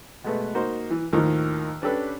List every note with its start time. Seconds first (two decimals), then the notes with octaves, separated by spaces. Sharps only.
0.24 B2 G#3 A3 B4
0.55 A#3 D#4 F#4 C5
0.90 E3
1.13 D#2 A2 D#3 F3
1.82 C#4 D4 G4 A4 B4